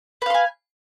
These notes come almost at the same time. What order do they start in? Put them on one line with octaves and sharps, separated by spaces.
B4 F5 C6 G#5